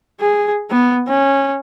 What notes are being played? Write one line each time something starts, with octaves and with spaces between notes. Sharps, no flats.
G#4
B3
C#4